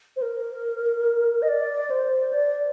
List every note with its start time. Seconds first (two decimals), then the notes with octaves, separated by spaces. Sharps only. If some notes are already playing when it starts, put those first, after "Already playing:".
0.16 C5
0.22 A#4
1.42 D#5
1.48 D5
1.90 C5
2.33 D5